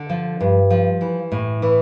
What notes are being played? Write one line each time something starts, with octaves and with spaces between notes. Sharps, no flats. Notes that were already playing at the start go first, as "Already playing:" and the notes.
Already playing: D3
F3
G2
F3
E3
A2
E3